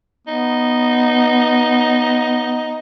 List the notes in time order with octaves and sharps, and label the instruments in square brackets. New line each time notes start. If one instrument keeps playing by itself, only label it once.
[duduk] B3 [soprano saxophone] D#4